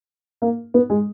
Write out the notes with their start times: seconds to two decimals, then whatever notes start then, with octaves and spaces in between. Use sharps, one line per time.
0.42 A#3
0.74 B3
0.90 G#3